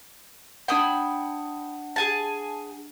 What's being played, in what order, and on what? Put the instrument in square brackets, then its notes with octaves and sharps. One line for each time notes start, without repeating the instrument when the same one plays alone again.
[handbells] D4 F#5 [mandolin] G5 B5 D#6
[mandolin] G#4 G#5 A5